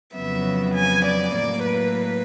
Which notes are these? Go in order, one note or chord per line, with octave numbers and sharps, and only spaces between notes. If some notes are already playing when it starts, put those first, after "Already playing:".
F2 C#3 F#3 B3 E5
G#5
D5
A2 F#3 A#3 D5
B4